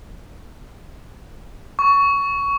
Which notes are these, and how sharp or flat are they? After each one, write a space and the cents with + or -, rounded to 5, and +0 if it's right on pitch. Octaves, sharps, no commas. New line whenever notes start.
C#6 +15